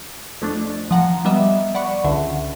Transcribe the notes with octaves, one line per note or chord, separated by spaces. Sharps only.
F2 A3 D4
F3 F#5 A#5
G3 B3 D#5 E5
D5 F#5 B5 C#6
C#2 D3 E5